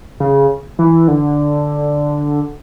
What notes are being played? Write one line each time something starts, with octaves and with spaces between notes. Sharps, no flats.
C#3
E3
D3